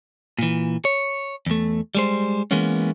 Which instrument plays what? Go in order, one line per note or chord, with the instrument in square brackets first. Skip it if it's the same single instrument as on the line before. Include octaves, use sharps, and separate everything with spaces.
[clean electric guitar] A#2 E3
C#5
E2 A3
G3 G#3 C5
E3 G#3 A#3 B3 C#4